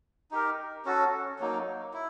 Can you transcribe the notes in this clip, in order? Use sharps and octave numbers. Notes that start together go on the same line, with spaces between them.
D#4 G4 A#4
C#4 F#4 A4
F#3 A#3 D#4
E4